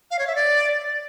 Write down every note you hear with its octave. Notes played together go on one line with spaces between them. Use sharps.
F5
C#5
E5
D5